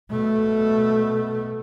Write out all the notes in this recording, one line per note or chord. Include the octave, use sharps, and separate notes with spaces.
B2 A3